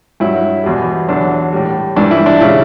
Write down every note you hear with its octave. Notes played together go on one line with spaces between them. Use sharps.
G2 F#3 E4
E2 B2 G3
E2 D3 F#3 D4
A2 G3
G2 E3 G3 D4
E4
D4
C#3 G3 E4